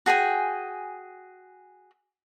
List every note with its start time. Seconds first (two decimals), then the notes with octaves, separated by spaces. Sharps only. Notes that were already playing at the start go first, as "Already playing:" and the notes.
0.06 F#4 G#4 G5 G#5